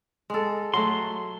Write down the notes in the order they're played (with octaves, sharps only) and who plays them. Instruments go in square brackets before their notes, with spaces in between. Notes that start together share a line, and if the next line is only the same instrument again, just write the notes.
[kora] G#3 A4
[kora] F#3 A3 F#5 [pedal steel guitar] C6